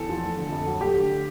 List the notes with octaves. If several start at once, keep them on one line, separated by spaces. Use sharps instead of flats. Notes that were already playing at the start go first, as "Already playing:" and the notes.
Already playing: E2 A4
F3
A3
D3
F2
F#3
A3 G4
D3